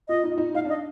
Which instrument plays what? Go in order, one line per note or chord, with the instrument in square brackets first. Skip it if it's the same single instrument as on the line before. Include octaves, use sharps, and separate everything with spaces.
[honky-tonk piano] F4 [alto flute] D#5
[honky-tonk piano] D#4
F4
D#4
[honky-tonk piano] D#4 [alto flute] F5
[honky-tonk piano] D4 [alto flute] D#5